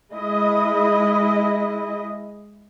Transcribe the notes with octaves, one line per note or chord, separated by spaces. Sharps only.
G#3 E4 D#5